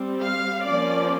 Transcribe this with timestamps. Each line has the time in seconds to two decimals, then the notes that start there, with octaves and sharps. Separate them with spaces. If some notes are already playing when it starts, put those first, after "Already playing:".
Already playing: G3 C4
0.23 F5
0.64 F3 A#3 C#4 D5